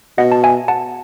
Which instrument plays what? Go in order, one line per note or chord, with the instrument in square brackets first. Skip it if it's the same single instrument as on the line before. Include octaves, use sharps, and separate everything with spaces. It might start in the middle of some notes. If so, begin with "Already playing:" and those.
[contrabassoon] B2 [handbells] D#5 F#5
[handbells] A5
E5 G#5
F#5 A5